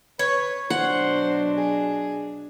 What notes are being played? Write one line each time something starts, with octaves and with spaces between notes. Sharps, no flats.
B4 C#5
B2 F#3 D4 C5 F#5
G#4